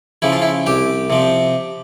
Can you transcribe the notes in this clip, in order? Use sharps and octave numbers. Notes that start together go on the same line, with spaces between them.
C#3 F3 E4
F4
E4
C2 G4
C3 F3